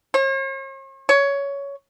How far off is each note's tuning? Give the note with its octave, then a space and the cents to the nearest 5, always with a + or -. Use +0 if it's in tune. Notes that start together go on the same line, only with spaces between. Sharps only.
C#5 -45
C#5 +15